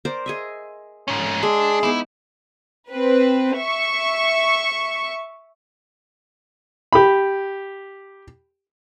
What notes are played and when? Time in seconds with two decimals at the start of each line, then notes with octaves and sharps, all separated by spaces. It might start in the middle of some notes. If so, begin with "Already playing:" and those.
0.05 A#4 C5 D5
0.26 G#4 D#5 E5
1.08 G#2 C#4
1.43 G#3 D4 G#4 D#5 E5
1.83 B3 D#4 E4 D6
2.91 C4 B4
3.58 E5 C#6
6.93 G4 B5